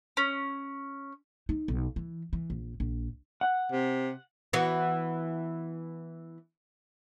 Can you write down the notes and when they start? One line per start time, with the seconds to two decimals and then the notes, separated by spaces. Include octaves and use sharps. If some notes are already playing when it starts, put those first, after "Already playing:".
0.17 C#4
1.49 D#4
1.68 B1
1.96 E3
2.33 E3
2.50 A#1
2.80 A#1
3.41 F#5
3.72 C3
4.53 E3 B3 F#4